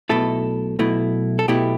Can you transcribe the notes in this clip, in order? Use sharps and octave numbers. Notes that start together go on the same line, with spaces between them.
B1 B2 A3 E4 A4
B1 B2 A3 E4
A4
B1 B2 A3 E4 G4